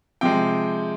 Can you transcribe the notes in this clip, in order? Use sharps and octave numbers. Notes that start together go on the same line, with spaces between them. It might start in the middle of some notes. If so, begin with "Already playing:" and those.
C3 F3 G#3 G5